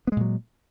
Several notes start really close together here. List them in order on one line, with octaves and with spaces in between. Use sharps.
B3 G#3 A#2 F#3